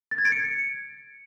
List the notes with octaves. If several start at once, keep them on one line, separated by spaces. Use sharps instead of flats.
A6
G#6
D7
C#7